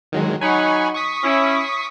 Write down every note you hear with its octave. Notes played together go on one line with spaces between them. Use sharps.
D#3 F#3 G#3
F#3 D#4 F#5 G#5 B5 C#6
C#6 D#6 B6
C#4 E4